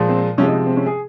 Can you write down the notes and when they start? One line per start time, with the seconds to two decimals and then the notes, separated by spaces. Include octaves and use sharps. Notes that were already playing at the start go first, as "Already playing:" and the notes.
Already playing: A#2 F3 G#3
0.09 C4
0.38 C3 F3 G#3 C#4
0.48 D#4
0.66 C4
0.77 C#4
0.86 G#4